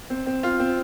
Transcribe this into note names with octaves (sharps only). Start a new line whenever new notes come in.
C4
C4
F4
C4